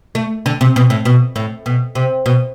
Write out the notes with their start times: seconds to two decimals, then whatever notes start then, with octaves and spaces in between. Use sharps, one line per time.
0.15 A3
0.46 D3
0.61 C3
0.76 B2
0.90 A2
1.05 B2
1.36 A2
1.66 B2
1.95 C3
2.26 B2